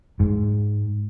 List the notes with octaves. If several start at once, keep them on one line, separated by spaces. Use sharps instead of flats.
G#2